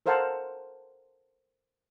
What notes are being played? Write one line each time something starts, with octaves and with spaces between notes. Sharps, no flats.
A4 A#4 C5 F5 F#5 A5